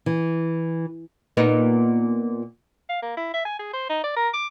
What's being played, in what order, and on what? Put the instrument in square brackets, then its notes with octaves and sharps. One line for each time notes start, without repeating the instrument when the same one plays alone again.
[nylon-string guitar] E3
[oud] A#2 B3 D#4
[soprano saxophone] F5
A#3
E4
E5
G#5
G#4
C5
D#4
D5
A#4
D6